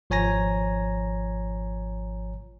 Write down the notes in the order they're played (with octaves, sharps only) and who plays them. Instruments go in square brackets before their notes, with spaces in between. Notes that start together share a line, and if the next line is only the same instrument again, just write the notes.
[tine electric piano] G#1 F3 C#5 G#5 A#5 A#6